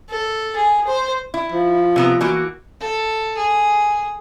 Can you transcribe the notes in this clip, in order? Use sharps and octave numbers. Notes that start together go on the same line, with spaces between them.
A4
G#4
C5
E4
F3
C3 B3 A#5
E3 A#3 F#4
A4
G#4